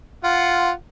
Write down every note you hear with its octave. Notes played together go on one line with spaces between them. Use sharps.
F4 F#5